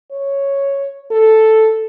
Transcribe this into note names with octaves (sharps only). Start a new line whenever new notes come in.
C#5
A4